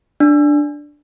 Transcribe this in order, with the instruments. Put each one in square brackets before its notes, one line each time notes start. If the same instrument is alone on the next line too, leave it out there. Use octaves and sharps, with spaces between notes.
[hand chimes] D4